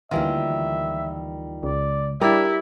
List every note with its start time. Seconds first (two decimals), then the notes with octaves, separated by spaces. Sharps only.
0.11 D2 D#3 E3 G3 A#3 F4 E5
1.63 C#2 D5
2.21 G3 D4 E4 A#4 D5 B6